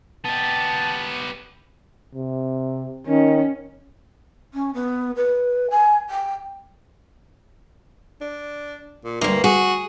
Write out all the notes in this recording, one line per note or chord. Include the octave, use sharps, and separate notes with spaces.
B3 G4 A5
C3
D#3 C#4
C#4
B3
B4
G#5
G5
D4
A#2
D2 G2 A#3
F#4 G#4